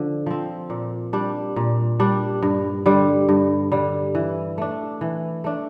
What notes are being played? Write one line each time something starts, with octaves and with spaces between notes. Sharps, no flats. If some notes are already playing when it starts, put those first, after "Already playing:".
Already playing: D3 F3
F3 C4
A#2
G3 D4
A#2
G3 D4
G2
D3 G3
G2
D3 G3
E3
A3 D4
E3
A3 D4